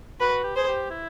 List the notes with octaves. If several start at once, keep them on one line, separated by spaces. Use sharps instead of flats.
F#4 B4
G4
G#4 C5
G4
E4